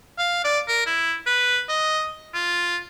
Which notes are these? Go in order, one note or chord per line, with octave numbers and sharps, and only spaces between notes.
F5
D5
A#4
E4
B4
D#5
F4